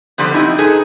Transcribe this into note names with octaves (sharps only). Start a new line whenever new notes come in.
D3 F3 G3 B3
C4 C#4 D#4 E4
D#4 G#4 A4 B4